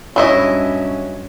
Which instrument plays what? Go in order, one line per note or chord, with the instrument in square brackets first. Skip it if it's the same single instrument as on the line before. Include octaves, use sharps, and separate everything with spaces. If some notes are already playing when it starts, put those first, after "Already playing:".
[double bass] G2 C#4 [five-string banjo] F#3 E4 D#5